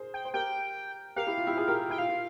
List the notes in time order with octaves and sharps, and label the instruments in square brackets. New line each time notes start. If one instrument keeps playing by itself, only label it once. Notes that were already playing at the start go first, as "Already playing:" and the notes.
Already playing: [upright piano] G#4 A#4 C5
[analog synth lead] G5
[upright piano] C5
[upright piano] G4 A#4 [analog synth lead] G5
[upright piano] G4 A#4 [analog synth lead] F5
[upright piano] E4 G4
F4
E4 G4
F4 G#4
G4 A#4
[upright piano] E4 [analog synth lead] G5
[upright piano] F4 [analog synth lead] F5
[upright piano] F4